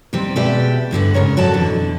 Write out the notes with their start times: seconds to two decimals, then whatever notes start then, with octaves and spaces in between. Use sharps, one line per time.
0.13 C3 D#3 G3 C4
0.36 B2 G#3 B3 G4 D5 E5
0.91 D2 G2 D3 B3
1.14 G#2 C#3 A#4 C#5
1.36 F#2 F#4 A4 D5 A5
1.54 F2 B2 D3 E3